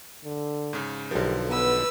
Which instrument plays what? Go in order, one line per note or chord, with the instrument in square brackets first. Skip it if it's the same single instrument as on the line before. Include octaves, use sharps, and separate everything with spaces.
[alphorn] D3
[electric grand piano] G#2 C#3
[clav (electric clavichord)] B1 A#4 [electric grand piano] D3 F3 [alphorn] G4
[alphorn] B3 [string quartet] B4 E6